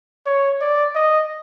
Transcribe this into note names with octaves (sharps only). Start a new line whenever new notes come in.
C#5
D5
D#5